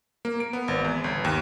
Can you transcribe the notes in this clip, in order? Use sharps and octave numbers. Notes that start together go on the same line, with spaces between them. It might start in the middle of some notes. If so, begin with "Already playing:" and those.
A#3
D7
B3
G#1
E2
G1
D#2